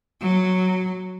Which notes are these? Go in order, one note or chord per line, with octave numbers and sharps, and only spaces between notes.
F#3